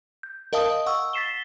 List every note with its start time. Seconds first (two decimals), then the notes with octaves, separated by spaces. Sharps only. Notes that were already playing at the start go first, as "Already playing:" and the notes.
0.23 G6
0.53 A#4 D#5 F5 A5 D#6
0.86 F#5 C#6 E6
1.13 A6 B6 C7 E7 G7